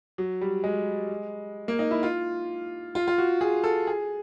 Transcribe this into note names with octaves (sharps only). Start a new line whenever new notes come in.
F#3
G3
G#3
A#3
D#4
E4
F4
F4
F4
F#4
G#4
A4
G#4